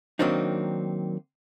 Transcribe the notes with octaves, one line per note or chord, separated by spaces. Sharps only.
D#3 F#3 A#3 C4 D4 D#4